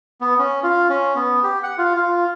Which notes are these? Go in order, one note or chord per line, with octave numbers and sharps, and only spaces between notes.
B3
C#4
F4
C#4
B3
G4
F#5
F4
F4